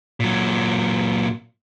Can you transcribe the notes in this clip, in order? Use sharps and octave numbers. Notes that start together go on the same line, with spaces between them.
A#2 F#3